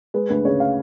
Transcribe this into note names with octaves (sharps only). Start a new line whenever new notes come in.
G#3 B4
D2 B4
C#3 C#5
F5